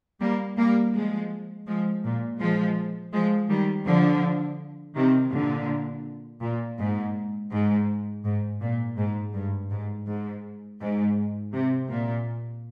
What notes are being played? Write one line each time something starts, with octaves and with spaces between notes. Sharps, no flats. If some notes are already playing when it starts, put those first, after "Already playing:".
G3 A#3
G3 A#3
F3 G#3
F3 G#3
A#2
F3 G#3
F3 G#3
D#3 G3
D3 F3
C3 D#3
A#2 D3
A#2
G#2
G#2
G#2
A#2
G#2
G2
G#2
G#2
G#2
C3
A#2